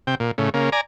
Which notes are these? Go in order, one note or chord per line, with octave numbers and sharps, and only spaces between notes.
C3 G5
A#2
A2 C#3
C#3 A#3
D5 G#5 A#5